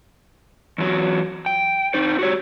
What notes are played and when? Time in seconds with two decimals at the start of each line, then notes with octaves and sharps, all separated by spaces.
0.78 E2 F#3
1.46 G5
1.94 C4 D#4 C5
2.19 F#4 G4 C#5